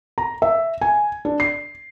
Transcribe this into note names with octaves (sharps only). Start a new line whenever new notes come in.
A#5
E5
G#5
D4
C7